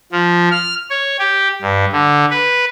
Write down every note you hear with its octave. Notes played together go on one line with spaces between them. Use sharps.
F3
F6
C#5
G4
G2
D3
B4